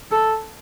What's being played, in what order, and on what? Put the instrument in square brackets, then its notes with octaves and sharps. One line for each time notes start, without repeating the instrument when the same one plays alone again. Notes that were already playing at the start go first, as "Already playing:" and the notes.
[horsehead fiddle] A4